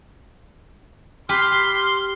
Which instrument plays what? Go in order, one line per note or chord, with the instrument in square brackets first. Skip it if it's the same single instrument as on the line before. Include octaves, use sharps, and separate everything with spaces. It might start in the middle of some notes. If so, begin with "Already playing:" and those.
[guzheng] G4 B4 [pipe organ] C6 [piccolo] F6